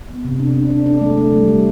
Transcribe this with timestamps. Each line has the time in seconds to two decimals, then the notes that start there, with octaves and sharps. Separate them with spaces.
0.09 B3
0.25 C3
0.40 D4
0.55 D4
0.70 D4
0.86 D4
1.01 A3
1.18 A3
1.33 G3
1.48 G3